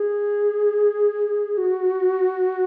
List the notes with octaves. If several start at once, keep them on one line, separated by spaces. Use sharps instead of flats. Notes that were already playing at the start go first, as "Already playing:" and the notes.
Already playing: G#4
F#4